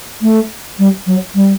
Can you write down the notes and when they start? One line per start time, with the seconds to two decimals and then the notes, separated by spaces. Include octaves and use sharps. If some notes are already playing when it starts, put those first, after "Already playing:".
0.22 A3
0.79 G3
1.07 F#3
1.35 G3